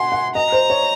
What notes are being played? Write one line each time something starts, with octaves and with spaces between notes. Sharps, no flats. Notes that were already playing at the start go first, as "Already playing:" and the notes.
Already playing: F#5 G#5 C6
F#5
D#5 A#5
C5
C#5